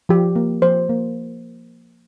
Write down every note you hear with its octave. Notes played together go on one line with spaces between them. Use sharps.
F3 G4
A#3
F3 C5
A#3